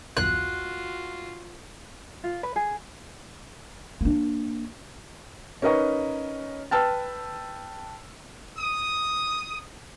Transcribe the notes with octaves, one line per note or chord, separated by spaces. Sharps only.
B1 E2 G2 F4 F#4 F#6
F4
B4
G#4
A#3 D4
C#4 D#4 A#4 B4 D#5 C#6
B4 G5 A5 E6 F6 A6
D#6